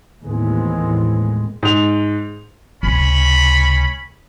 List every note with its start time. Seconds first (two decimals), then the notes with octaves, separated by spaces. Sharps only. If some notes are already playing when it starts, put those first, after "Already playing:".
0.24 D#2 A2 E3 G#3 B3 C4
1.63 G#2 F7
2.83 C#2 C3 C#4 B5